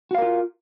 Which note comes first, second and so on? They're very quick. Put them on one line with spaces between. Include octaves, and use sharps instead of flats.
F#4 F5 A#4 F4